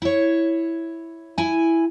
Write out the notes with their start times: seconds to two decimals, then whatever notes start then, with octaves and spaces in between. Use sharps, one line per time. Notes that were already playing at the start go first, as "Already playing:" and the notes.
0.02 E4 C#5
1.38 E4 G#5